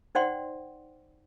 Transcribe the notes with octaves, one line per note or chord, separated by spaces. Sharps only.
D#4 C5 D5 F#5 G5 C6